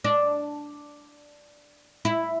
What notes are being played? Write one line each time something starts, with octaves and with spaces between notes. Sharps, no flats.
D4
E4